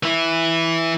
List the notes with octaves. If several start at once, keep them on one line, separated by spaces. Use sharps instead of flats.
E3 E4